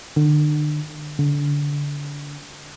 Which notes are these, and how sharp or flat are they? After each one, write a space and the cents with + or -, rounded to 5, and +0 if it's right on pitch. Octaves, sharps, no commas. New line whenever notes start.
D3 +35
D3 -25